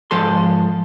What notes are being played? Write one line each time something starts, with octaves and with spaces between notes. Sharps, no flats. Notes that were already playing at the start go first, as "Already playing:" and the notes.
G#2 F3 A4 C6